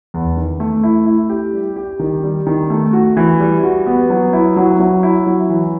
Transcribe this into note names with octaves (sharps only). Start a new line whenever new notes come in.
E2
D#3
A3
E4
E4
G4
G3
G4
D#3
G3
D#3
A3
F#4
E3
G3
F#4
B3
F#3
E4
F#3
F#3
E4
F#3
E3